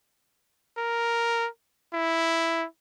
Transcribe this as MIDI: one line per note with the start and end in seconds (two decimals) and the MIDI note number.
0.78 1.47 70
1.93 2.65 64